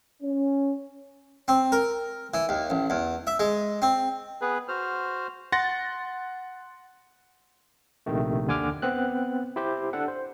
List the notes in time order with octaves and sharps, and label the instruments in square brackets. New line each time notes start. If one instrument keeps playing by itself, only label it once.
[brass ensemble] C#4
[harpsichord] C4
A#4
E3
D#2
A1
E2
E5
G#3
C4
[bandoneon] B3 G#4 B4
F#4 C5 F6
[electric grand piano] F#5 C6 A6 A#6
[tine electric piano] A#1 C3 D#3 A3
D#2 D3 G#5 D6 F6
B3 C4 F#6
E4 G4 C5
D4 A4 F#5
C5